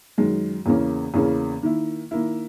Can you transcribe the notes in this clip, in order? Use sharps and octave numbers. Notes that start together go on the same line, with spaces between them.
F#2 D#3 G#3
E2 C#3 E3 A#3 C#4
E2 C#3 E3 A#3 C#4
D#3 A#3 E4
D#3 A#3 E4